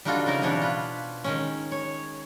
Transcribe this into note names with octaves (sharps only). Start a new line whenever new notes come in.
G3 D4 D#4 F4 F#4 A4
C#3 C4 D#4 F#4 A#4
B2 E3 G3 C4 D4 C#5
F4 B4
D#3 G#3 C#4
C#5